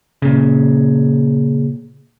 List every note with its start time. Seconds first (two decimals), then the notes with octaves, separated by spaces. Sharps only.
0.22 A#2 C#3